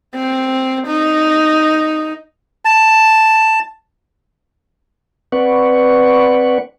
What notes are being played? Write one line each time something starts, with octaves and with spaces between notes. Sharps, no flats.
C4
D#4
A5
C4 B4 D5 F#5 C#6